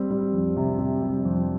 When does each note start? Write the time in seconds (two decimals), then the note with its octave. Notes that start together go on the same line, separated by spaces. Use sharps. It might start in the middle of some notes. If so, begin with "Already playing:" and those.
Already playing: G3 C4
0.11 G3
0.33 F2
0.57 C3
0.79 C3
1.02 G3
1.25 F2